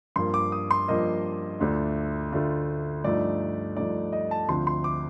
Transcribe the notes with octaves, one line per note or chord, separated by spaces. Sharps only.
G2 F3 A#3 C6
D6
D#6
C6
G2 F3 A#3 D#5
D2 D3 A3 D4 F4
D2 D3 A3 D4 F4
G2 F3 A3 D#4 D5
G2 F3 A3 D#4 D5
D#5
A5
D2 D3 F3 C4 C6
C6
D6